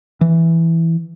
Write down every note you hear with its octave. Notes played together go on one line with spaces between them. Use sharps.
E3